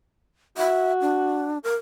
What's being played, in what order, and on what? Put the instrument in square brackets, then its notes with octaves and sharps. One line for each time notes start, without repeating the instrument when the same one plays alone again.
[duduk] F#4 [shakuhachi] E5
[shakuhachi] D4
A#4